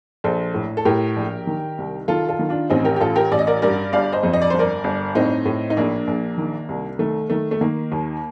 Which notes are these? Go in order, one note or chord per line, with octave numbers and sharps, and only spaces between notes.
A#1 A4 C5
A2
A4
A2 G4 A#4
A#1
D#3
C2
D#3 F4 A4
F4 A4
D#3
D4 F4
A1 C4 D#4
G4 A#4
G4
A1 F4 A4
G4 A#4
A1 D5
D#5
A#4 D5
G2 A#4 D5
G1 D5 F5
C5 D#5
F2
D#5
D5
G1 C5
A#4 D5
G1
A2 C4 D#4
A2
D#4
A#1 A#3 D4
A#1
D#3
C2
D#3 A3
D#3 A3
A3
D#3 A#3
D#2